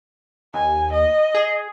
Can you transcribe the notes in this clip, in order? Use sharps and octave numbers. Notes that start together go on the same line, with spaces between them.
D#2 G#5
D#5
G#4